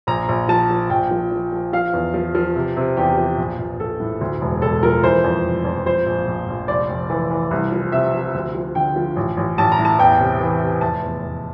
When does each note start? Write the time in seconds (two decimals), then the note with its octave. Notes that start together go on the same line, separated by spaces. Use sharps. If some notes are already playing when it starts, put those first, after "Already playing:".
0.07 A#1 A#5
0.29 A#1
0.48 F3 A5
0.70 F3
0.90 A#1 G5
1.10 F3
1.31 F3
1.52 F3
1.73 F3 F5
1.93 E2
2.14 F3
2.35 F3
2.56 C3
2.77 C3
2.97 E2 G4
3.17 F3
3.38 A#1
3.58 A#1
3.79 A#1 A4
4.00 A2
4.21 D2
4.41 E1
4.62 E1 A4
4.83 F3 A#4
5.03 E3 C5
5.24 F2
5.44 F1
5.65 F2
5.86 F3 C5
6.06 A#1
6.27 A#1
6.48 A#1
6.68 F1 D5
6.90 F1
7.10 E3
7.30 E3
7.51 C2
7.72 F3
7.92 C3 E5
8.14 F3
8.34 D2
8.55 F3
8.75 D3 G5
8.96 F3
9.16 A1
9.37 A1
9.58 A1 A5
9.72 A#5
9.78 A2
9.85 A5
9.99 E2 G5
10.20 C3
10.40 E3
10.61 C3
10.81 F1 A5
11.03 E2
11.23 F1